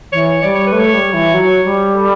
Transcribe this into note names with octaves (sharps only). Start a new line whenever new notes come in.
E3 C#5
G3 D5
C#5
B4
A3
C#5
G3
E3
F#3
G3
A4